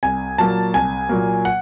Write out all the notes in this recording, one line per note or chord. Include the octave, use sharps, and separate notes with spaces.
C2 G#5
A#2 F#3 A#3 A5
C2 G#5
A#2 F#3 A#3
F#5